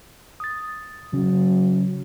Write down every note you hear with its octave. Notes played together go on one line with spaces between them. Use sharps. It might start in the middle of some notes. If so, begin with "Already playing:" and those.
D#6 A6
C#3 F#3 C#4